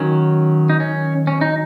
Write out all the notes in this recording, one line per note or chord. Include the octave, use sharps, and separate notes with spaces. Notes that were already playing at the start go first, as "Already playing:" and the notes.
Already playing: D#3 F#3 C#4
D#4
C#4
C#4
D#4